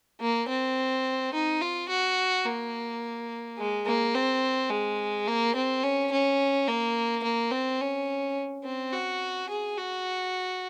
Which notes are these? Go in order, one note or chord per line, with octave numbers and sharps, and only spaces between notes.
A#3
C4
D#4
F4
F#4
A#3
G#3
A#3
C4
G#3
A#3
C4
C#4
C#4
A#3
A#3
C4
C#4
C4
F#4
G#4
F#4